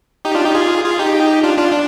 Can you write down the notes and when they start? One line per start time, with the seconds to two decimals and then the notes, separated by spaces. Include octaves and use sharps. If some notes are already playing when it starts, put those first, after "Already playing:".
0.25 D#4 G4
0.35 D4 F4
0.45 D#4 G4
0.54 F4 G#4
0.84 F4 G#4
0.99 D#4 G4
1.43 D4 F4
1.58 D4 F4
1.72 D4